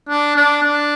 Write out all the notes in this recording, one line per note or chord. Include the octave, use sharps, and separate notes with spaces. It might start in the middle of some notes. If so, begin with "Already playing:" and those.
D4
D4
D4